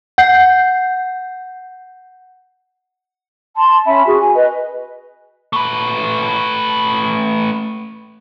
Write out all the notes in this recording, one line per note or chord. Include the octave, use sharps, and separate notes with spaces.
F#5 G6 C7
A5 C6
C#4 E5 B5
F#4 G#4
G#5
B4 D#5
A3 B4